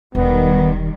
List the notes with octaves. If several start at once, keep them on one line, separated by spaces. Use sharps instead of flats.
E1 D#3 G3 B3